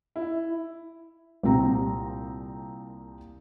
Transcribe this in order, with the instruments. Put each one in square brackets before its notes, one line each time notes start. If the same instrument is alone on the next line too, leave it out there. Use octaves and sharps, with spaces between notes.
[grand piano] E4
[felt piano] C2 A#2 C4 A#5